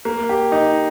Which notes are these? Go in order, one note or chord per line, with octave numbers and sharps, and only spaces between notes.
A#3
G4
D#4